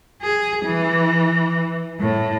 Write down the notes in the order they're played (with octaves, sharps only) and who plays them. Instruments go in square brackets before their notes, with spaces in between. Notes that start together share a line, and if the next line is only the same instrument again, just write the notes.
[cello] G#4
E3
A2